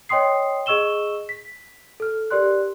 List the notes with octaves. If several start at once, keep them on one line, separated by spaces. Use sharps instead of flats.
C#5 D#5 G5 C6 D#6 C7
G#4 D#5 C#6 E6 E7 G7
B6
A4 F6
G4 A#4 D5 C6 F#6